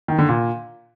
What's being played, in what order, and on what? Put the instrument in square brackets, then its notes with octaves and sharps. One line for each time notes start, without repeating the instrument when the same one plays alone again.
[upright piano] D#3
D3
A#2